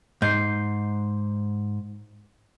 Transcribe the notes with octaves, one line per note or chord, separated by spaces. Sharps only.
G#2 G6 C7